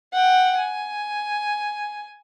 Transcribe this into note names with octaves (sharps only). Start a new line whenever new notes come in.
F#5 G5
G#5